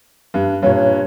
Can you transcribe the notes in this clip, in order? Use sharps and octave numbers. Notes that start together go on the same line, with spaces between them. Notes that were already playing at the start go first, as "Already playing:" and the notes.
G2
G2 A#2 C#5
C#5